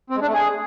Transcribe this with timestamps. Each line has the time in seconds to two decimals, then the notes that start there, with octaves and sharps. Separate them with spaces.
0.10 C4
0.16 G#3
0.22 D4
0.28 A3
0.34 G#4